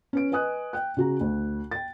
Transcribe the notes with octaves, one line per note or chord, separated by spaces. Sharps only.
C#4 B4 D7
B4 D#5 G#5 D#6 F#6
G5 F#6
C#3 F#4 A#5
D2
G5 A6